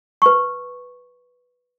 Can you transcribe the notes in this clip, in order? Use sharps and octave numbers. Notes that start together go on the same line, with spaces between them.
B4 C#6